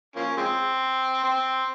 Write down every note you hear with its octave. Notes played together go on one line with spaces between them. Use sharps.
F3 A#3 C#4
F3 G#3 C4
C4